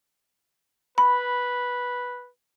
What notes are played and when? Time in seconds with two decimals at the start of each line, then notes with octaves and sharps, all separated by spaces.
0.98 B4 B5